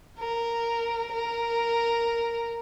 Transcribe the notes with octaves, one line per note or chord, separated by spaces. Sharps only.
A#4
A#4